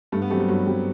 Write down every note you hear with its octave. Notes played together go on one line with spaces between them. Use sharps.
G2 A3
B3
F#3 A3 C4 G4
G3
G2 F#3
F#3 C4 G4